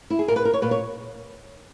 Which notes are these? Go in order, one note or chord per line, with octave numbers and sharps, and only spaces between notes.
E4
G#4
A#2 A#4
B4
A#4
C#5
A#2 B4
C#5